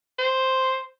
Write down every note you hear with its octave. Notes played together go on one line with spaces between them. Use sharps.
C5